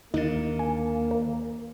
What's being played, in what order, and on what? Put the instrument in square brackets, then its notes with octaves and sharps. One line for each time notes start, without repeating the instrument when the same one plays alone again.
[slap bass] D#2 D3 [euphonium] A#3 [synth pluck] D#4 F#6 A6
[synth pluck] G#5
A#4